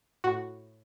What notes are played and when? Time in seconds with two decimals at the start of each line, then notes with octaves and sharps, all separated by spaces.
0.24 A2 F#4